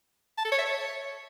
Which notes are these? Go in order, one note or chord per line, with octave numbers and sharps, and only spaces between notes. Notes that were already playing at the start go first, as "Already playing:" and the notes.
A5
A4
C#5
E5
C#5